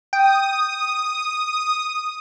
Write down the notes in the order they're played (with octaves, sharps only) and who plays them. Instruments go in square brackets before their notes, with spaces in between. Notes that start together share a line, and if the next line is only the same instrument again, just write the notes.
[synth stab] G5 [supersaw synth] D#6